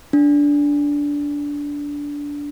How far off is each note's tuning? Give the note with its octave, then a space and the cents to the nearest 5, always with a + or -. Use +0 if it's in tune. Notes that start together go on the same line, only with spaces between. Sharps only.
D4 -15